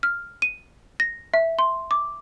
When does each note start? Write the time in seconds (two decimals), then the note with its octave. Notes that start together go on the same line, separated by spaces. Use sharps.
0.03 F6
0.42 D#7
1.00 A#6
1.34 E5
1.59 C6
1.91 D6